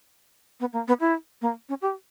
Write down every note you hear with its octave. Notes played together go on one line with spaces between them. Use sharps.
B3
A#3
B3
E4
A#3
C#4
G4